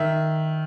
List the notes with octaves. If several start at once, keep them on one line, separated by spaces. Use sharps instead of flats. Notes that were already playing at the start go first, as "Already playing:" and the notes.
Already playing: D#3 E5